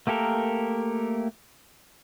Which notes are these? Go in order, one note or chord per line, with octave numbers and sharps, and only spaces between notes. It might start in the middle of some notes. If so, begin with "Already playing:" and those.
A3 A#3 G4 A4 A#4